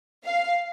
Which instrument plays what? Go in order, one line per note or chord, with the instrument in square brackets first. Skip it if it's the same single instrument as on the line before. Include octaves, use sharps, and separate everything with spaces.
[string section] F5